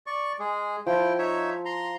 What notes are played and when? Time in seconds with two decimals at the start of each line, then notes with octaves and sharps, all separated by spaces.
0.07 D5 C#6
0.39 G#3 G#4
0.86 F3 E4 G5
1.18 D#4 C#5 E5
1.65 A#5 C6